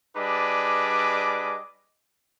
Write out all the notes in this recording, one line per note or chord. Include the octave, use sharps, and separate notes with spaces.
G3 D4 G#4 B4 D#5 D6